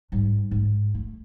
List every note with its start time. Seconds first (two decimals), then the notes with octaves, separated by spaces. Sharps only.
0.12 G#2 G3
0.51 G#2
0.94 A3